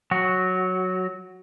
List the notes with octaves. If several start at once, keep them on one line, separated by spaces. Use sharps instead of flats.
F#3 F#4